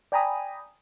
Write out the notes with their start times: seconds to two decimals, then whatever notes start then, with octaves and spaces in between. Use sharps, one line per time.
0.12 D5 G5 G#5 A#5 B5 D#6